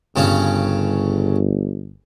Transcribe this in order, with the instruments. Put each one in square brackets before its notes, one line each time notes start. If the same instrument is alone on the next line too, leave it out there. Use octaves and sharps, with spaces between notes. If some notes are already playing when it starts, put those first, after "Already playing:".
[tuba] G1 [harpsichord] G2 C#3 C#4